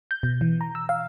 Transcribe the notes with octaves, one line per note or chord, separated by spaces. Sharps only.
G6
B2
E3
A#5
E6
F5